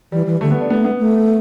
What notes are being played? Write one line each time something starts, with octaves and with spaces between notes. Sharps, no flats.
E3 G3
E3
D3 A3
B3
D4
A3 B3
B3
A3